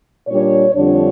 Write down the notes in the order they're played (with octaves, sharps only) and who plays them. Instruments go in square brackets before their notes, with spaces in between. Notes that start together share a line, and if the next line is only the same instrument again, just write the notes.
[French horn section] A#2 G3 D4 C#5
F2 D3 G3 D4 C#5